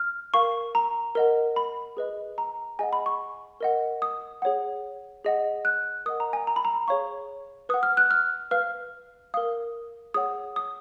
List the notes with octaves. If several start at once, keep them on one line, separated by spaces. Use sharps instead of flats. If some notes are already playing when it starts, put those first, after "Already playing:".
Already playing: F6
A#4 F5 C#6
A#5
A#4 D#5 F#5
B5
G#4 B4 D#5
A#5
G#4 D#5 F#5 G#5
B5
C#6
A#4 D#5 F#5
D#6
G#4 C#5 F#5
G#4 D#5 F#5
F#6
A#4 D#5 F#5 D#6
A#5
G#5
A#5
B5
A#5
G#4 C#5 F5 C#6
B4 F#5 D#6
F6
F#6
F6
B4 F5 F6
A#4 F5 D#6
G#4 C#5 F#5 D#6
D#6